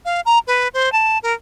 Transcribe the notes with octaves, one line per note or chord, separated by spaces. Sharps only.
F5
A#5
B4
C5
A5
A#4